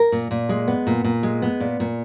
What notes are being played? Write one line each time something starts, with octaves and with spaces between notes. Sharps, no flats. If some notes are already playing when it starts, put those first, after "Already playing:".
Already playing: A#4
A#2
A#2
G#3
B3
A#2
A#2
G#3
B3
A#2
A#2